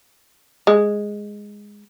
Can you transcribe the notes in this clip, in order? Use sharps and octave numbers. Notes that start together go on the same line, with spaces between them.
G#3